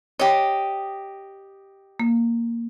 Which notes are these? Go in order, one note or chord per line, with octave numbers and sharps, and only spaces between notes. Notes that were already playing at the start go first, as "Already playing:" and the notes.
G4 C#5 D#5
A#3